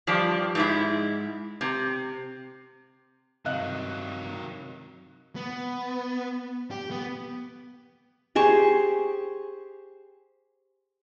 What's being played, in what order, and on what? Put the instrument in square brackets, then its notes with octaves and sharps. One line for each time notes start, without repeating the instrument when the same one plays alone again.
[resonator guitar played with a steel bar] G2 F3 D4 G4
G#2 G#3 E4
C3
[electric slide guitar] G2 C3 [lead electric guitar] D#3 F#3 [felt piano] D#5 F5 F#6
[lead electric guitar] B3
G4
B3
[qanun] G4 G#4 C5 C#6